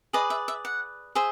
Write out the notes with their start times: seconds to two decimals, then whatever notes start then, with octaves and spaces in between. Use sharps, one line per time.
0.13 G#4 B4 D5 D#5
0.30 E5
0.48 E5
0.65 F#5
1.15 G#4 C5 E5